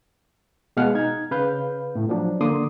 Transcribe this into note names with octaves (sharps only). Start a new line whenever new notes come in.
B2 G#3 F5 F#5 F6
D#4 G#6
C#3 B4 F5 G6
A2
F3 F#3 D4
D3 A#3 C6 D6 D#6